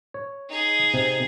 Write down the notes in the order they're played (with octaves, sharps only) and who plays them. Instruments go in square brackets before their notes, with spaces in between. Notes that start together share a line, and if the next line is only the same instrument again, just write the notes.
[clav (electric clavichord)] C#5
[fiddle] D#4 G#4
[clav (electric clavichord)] C3